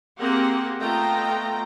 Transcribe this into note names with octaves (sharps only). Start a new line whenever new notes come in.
A#3 C4 G4 G#4 A#4 F#5
A3 B3 F4 D#5 G5 A#5